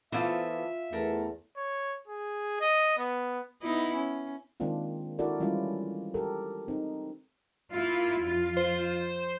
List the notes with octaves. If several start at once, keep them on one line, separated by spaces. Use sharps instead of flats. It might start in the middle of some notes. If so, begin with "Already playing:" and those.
E3 B3 F4 A4 C5 E5
E2 A3 A4 A#4
C#5
G#4
D#5
B3
B3 D#4 E4
C#4
D#3 G#3 A#3 C4 D4 F4
D4 E4 F#4 A4 A#4 D5
E3 G3 G#3 C#4 E4 F4
G4 A4 A#4
C4 D#4
A#3 E4 F4
F2 F4
C5